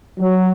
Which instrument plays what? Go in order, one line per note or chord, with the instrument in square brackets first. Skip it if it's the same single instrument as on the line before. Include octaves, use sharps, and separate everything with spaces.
[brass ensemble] F#3